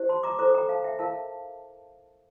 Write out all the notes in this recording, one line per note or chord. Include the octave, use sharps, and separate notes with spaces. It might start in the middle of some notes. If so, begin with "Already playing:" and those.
Already playing: E4 G4 C5
A5 C6
A#5 D6
E4 A4 C5 A#5 D6
G5 A#5
F5 A5
E5 G5
E4 A#4 F5 A5